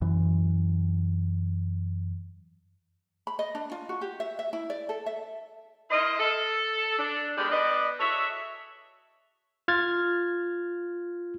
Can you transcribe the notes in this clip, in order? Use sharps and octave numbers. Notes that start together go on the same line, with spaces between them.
F#2 E3
B5
D#5
D4
F4
F#4
G4
E5
E5
E4
D5
A4
E5
E4 A#4 C5 D#5
A4
D4
D3 D#3 G#3 B3 D4 G4
B3 D4 D5 D#5
F#4 G#4 A4 C#5 E5
F4 F6 G#6 A6